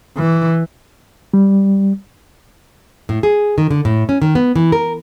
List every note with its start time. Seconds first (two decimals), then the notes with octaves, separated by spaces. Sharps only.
0.17 E3
1.34 G3
3.09 A2
3.23 G#4
3.58 D#3
3.71 D3
3.85 A2
4.09 C#4
4.22 D#3
4.35 B3
4.56 E3
4.72 A#4